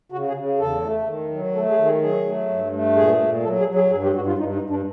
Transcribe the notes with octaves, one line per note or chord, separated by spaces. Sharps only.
C#3 F#4
G#4
C#3
E2 A4
A3
D#3
F#3
A3 A4
G#4
D#3
G#4
F#3 G#4
A3
G2
A3
A#2 G#4
A#2
F#3 A4
G#4
F#3
G#4
G2 G#4
G4
G2 F#4
F4
G2 D#4
D#4
G2
D4